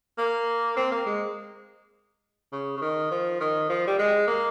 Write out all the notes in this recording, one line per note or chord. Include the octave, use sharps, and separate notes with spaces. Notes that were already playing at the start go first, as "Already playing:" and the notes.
A#3
C4
A#3
G#3
C#3
C#3
D#3
F3
D#3
F3
G3
G#3
A#3